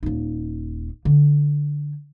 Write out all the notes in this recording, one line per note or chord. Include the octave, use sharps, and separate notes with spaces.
D#1 D#4
D3